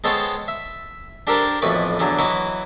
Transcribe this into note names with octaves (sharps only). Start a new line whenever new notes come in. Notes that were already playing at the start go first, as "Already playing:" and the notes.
G#3 B3 A4 C5 C#5 G5
E5
D4 G4 A4 A#4 C5
B1 F2 A2 E3 B4 C#6
E2 D3 F#3 G#5
E3 F#3 E4 D#5 C#6 D6